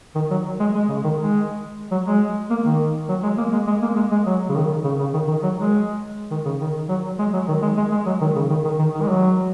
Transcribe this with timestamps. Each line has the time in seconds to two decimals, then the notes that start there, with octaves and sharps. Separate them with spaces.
0.15 D#3
0.31 F#3
0.60 G#3
0.75 G#3
0.89 C#3
1.04 D#3
1.19 G#3
1.91 F#3
2.06 G#3
2.50 A#3
2.65 D#3
3.09 F#3
3.23 G#3
3.38 A#3
3.53 G#3
3.67 G#3
3.82 A#3
3.96 G#3
4.11 G#3
4.26 F#3
4.49 C#3
4.56 D#3
4.84 C#3
4.99 C#3
5.14 D#3
5.28 D#3
5.43 F#3
5.58 G#3
6.31 D#3
6.45 C#3
6.60 D#3
6.89 F#3
7.19 G#3
7.33 F#3
7.48 D#3
7.62 G#3
7.77 G#3
7.92 G#3
8.06 F#3
8.21 D#3
8.36 C#3
8.50 D#3
8.65 D#3
8.79 D#3
8.95 D#3
9.02 G#3
9.09 F#3